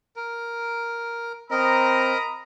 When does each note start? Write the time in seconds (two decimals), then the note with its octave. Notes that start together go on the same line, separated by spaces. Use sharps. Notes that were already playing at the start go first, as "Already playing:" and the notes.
0.16 A#4
1.51 C4 A#4 D#5 A#5 B5 D#6